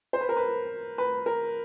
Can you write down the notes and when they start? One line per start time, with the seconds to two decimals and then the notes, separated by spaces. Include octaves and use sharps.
0.13 C5
0.21 B4
0.29 A#4
0.37 B4
0.98 B4
1.26 A#4